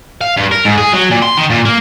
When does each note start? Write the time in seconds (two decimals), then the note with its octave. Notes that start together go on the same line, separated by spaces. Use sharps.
0.21 F5
0.37 G2
0.51 A#4
0.65 G#2
0.78 G#4
0.93 F#3
1.11 A#2
1.23 C6
1.38 D#3
1.50 A#2
1.65 A#3